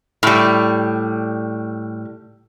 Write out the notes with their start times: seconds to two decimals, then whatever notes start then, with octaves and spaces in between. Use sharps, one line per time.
0.23 A2 G3